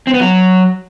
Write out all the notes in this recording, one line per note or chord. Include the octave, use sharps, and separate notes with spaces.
C4
B3
F#3